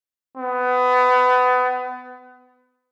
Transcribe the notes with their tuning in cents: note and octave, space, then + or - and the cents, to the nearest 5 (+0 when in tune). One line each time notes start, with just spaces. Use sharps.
B3 +25